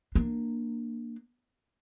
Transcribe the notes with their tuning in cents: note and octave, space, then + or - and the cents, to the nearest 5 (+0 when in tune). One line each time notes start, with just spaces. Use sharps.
A#3 +0 D4 +15